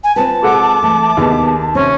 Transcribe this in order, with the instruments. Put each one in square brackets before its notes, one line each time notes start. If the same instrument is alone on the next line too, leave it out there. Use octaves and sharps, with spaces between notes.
[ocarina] G#5
[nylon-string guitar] C4 F4 B4 [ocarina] A5
[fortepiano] G#3 A4 F#5 [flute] D6
[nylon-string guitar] E3 A3 E5
[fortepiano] D#2 [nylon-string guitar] B3 D#4 G#4
[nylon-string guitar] C3 C4 [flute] C#4